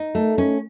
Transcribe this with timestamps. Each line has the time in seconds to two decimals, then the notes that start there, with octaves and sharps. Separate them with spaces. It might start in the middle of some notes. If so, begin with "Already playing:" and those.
Already playing: D#4
0.15 A3
0.38 C#4